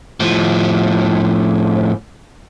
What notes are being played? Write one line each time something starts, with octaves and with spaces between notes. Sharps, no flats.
A2 F3